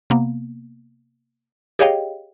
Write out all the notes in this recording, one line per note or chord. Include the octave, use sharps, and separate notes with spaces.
C3 A#3 B3
G4 G#4 C#5 D#5 F5 G5